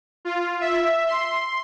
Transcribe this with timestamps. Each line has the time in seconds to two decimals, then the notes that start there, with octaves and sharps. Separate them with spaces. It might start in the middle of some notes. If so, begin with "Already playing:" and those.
0.25 F4
0.60 E5
1.07 C6